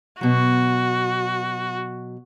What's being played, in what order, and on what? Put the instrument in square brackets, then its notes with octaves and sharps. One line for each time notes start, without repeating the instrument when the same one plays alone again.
[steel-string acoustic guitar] B2 F#3 [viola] F#4